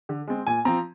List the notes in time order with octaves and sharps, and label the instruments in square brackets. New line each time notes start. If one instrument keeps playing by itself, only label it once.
[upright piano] D3
G#3 C4
A#2 G#5
F3 C4 A#5